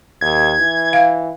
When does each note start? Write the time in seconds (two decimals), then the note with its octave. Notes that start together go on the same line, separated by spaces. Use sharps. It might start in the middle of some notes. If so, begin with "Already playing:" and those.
0.21 D#2 G#6
0.60 E3
0.93 F5